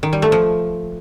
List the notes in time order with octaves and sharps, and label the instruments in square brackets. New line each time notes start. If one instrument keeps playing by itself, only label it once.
[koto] D#3
G3
A3
F3